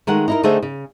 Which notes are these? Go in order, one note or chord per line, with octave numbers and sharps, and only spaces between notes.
D#3 G#3 A3 F#5
D#4 E4 A#4
D3 A3 D#4 G#4 C5 E5
C#3